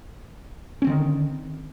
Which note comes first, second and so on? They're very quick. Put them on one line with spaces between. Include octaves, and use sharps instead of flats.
C#4 C4 D3 D#3